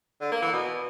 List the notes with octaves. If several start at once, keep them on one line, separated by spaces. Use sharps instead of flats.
D3
A#3
E3
B2